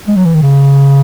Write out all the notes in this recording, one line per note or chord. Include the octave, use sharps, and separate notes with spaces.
G#3
F#3
E3
D#3
C#3